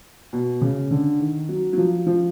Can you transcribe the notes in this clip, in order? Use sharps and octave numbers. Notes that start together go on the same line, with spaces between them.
B2
C#3
D3
D#3
F#3
F#3
F3
F3